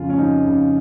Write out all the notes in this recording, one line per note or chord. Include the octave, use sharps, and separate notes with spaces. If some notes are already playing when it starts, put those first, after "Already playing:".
Already playing: F2 C#3 F4
C#4
F2 D#4
C#3